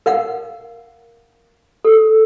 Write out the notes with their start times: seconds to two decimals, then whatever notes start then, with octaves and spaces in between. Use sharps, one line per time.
0.06 A#4 F5 F#5
1.85 A4